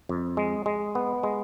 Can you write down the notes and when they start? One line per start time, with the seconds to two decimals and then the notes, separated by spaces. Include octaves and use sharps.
0.09 F2
0.37 G#3
0.66 G#3
0.95 B3
1.23 G#3